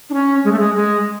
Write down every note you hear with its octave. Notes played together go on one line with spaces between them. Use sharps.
D4
C#4
G#3
A3
G#3
G#3